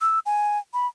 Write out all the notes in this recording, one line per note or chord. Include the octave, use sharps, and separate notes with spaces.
E6
G#5
B5